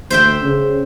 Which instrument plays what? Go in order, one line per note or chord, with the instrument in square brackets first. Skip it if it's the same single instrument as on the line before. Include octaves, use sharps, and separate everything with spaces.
[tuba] D2 [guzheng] C5 E5 G5
[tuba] C#3